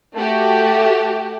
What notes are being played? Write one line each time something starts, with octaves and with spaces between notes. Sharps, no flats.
A3 F#4 G4